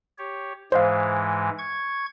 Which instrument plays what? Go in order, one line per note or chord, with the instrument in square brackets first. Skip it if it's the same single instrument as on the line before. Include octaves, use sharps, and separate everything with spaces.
[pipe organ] G4 C#5
[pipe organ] G#2 E3 G#3 [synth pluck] C5 D#5 F5
[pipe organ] C#6 G#6